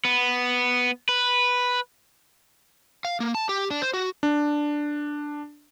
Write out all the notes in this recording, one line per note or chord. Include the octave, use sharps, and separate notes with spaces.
B3
B4
F5
A#3
A5
G4
D4
C5
F#4
D4